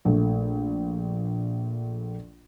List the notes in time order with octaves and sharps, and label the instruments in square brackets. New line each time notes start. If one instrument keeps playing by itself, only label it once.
[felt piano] A#1 A3